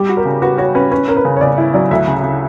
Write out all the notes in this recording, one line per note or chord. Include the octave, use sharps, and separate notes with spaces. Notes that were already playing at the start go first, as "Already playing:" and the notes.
Already playing: G3 G4
F#4
A#4
C#3
F#4 B4
F#4 C#5
C#4 B4
C#4 B4
C#4 A#4
B4
C#3
C#5
C#3 D5
E4 E5
F#3 D5
D2 E5
C#3
C#3